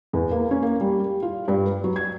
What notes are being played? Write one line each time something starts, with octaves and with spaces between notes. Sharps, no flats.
E2
A#3
C#4
A#3
G3
G4
F4
G2
B4
F#3
G#6